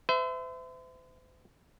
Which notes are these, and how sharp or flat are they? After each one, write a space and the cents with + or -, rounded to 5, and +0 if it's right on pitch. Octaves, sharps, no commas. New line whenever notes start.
C5 -45 E5 +0